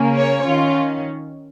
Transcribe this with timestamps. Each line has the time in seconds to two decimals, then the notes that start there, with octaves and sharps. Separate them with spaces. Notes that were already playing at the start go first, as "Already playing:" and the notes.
Already playing: C#3 A#3 C#4
0.17 C#5
0.46 D#3 C#4 F4